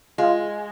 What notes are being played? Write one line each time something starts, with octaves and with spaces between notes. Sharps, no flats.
G#3 F4